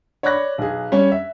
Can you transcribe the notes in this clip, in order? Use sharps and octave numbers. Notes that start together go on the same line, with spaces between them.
C#5 D5 B5 C#6 F#6 A#6
B1 G#4
G3 C#4 C#5
E5